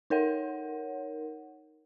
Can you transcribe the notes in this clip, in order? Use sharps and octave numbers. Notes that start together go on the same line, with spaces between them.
D#4 A#4 C#5 F#5